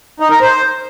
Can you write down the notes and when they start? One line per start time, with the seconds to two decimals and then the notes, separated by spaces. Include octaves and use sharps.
0.20 D#4
0.31 A#4
0.41 C5